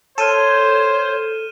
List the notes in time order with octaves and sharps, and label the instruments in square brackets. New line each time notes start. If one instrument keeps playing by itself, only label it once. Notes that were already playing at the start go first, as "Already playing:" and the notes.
[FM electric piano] A4 [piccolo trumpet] C5 [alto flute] C#5 [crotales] F6 D#7 E7